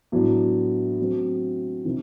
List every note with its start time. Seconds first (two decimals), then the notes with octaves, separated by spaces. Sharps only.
0.12 A2 F#3 B3 D4
0.99 F#3 A3 C4
1.85 C3 D#3